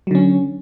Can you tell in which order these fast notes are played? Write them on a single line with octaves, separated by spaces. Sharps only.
F#3 D3 C#4